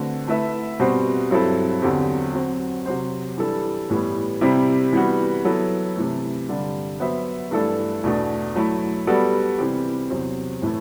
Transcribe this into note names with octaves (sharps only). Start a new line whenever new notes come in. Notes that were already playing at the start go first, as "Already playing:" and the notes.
Already playing: D3 A3 C4 F#4 B4
A3 E4 B4 E5
B2 G3 C4 F#4 C5
G2 F#3 C4 E4 A4
E2 D3 F#3 C4 G4
F#3 C4 F#4
C3 F#3 C4 F#4 C5
E3 G3 D4 A4
A2 E3 G3 B3
C3 G3 C4 E4 G4
E3 G3 B3 F#4
F#3 B3 E4 A4
C3 E3 A3
G2 D3 G3 D4
F#3 B3 F#4 C5 E5
G2 E3 A3 D4 A4
E2 B2 A3 D4
F#3 A3 E4
G3 B3 F#4 A4 D5
C3 E3 G3 C4 G4
E2 C3 F#3 C4
A2 E3 A3